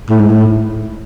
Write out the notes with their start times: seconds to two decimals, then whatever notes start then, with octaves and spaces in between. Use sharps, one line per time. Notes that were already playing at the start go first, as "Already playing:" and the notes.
0.10 A2
0.20 G#2
0.30 A2